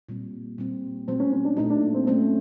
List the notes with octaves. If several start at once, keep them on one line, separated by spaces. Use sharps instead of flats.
A#2 G3 C4
A#2 G3 C4
A#2 F#3 A3 C4
C#4
C#4
D4
A#2 F#3 A3 D#4
D4
C4
F#3 A3 C4 C#4